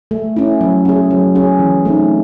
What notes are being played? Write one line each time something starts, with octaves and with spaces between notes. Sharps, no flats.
A3
C#4 E4
F#3
C#4 G#4
F#3
C#4 G#4
E3
A3 C4 D#4